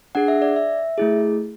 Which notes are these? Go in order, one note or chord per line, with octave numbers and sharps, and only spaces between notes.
D4 G#4 F#5
E5
D5
E5
A3 E4 G#4